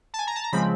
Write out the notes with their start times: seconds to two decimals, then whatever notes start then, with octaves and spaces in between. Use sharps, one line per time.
0.14 A5
0.19 G#5
0.27 A#5
0.36 A5
0.44 A#5
0.52 C#3 F3 G#3 C4 B5